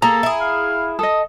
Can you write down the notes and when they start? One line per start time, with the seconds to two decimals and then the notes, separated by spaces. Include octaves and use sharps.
0.02 A#3 G#4 A4 A#5
0.23 E4 G#4
0.41 F5
0.99 A4 D#5 D#6